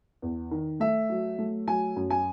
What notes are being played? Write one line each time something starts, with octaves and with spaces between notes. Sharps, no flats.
E2
D#3
A3 E5
F#3
A3
F#3 G#5
F#2
G#5